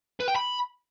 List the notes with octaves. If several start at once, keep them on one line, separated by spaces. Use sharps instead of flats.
B4
G5
B5